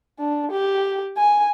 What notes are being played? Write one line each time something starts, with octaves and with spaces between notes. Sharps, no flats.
D4
G4
G#5